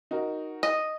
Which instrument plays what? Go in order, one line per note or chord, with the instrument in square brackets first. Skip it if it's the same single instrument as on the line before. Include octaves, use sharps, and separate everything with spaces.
[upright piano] D#4 F#4 A#4
[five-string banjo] D#5